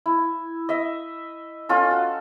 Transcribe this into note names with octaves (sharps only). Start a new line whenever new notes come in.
E4
D#5 E5
C#4 F4 A4
F#4